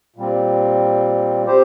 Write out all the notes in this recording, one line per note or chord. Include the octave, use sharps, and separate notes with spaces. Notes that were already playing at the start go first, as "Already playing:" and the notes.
A#2 G3 C4
C4 G4 C5